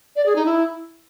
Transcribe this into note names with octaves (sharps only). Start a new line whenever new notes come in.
D5
G#4
D#4
E4